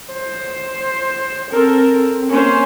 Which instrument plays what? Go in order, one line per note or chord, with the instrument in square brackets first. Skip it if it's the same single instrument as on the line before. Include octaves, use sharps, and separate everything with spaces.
[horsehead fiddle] C5
[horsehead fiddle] C4 [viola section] A4 A#4
[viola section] A#3 C#4 C5